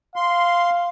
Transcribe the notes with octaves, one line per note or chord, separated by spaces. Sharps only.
F5 C6